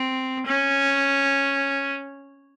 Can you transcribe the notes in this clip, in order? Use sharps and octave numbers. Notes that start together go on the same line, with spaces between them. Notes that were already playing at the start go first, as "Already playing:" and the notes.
Already playing: C4
C#4